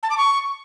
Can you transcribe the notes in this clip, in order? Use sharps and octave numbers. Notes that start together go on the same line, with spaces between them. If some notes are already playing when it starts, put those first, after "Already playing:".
A5
D6
C#6